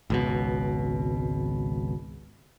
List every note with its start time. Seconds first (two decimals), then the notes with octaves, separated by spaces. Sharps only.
0.10 G#1 C#2 B2